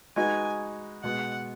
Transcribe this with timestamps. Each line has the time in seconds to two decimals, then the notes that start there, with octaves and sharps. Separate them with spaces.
0.16 G#3 D#4 F#4 B4 G#5
1.03 B2 G#3 B3 F#5